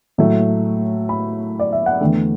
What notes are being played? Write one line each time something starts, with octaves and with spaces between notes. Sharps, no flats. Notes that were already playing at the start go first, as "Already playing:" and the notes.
A2 F#3 A3
B5
D5
E5
F#5
E2 D3 A3 G5